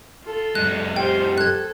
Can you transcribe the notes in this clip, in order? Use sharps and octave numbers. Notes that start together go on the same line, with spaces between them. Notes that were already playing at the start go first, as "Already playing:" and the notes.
F4 A4
F#2 G#3 F#6
F4 G4 C5 G5
A4 F#6 G#6